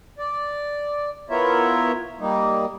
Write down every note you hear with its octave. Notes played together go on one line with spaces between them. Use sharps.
D5
B3 E4 F4 A#4 C#5 E5
G3 A#3 D#4